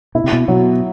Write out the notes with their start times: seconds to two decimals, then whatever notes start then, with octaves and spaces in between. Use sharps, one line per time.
0.15 B2 E4
0.24 C3
0.33 B2
0.48 B2 F#3